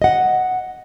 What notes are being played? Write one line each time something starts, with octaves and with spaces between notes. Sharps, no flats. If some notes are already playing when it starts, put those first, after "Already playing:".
D#5 F#5